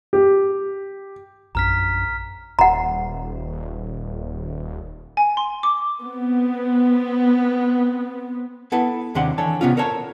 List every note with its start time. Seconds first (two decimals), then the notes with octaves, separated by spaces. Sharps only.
0.13 G4
1.55 A#1 F#2 D4 A#5 F6 B6
2.59 D#1 F#5 A#5
5.17 G#5
5.37 C6
5.63 D6
6.01 B3 C4
8.72 B3 E4 A4 B4
9.15 D#2 C3 D#3 D4 F#5 C6
9.38 D3 E3 A4 C#5 A5
9.61 C3 B3 C#4 F4
9.77 A4 A#4 C5 C#5 A5